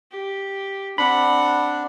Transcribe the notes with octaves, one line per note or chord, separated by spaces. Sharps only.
G4
C4 D4 F#5 B5